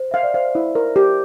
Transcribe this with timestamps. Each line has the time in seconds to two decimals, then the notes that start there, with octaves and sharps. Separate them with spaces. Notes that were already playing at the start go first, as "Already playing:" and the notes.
Already playing: C5
0.11 E5 F5
0.23 D5
0.34 C5 F5
0.55 E4
0.75 A#4
0.96 G4